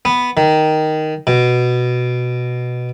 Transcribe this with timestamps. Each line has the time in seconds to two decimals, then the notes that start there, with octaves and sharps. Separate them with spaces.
0.05 B3
0.37 D#3
1.27 B2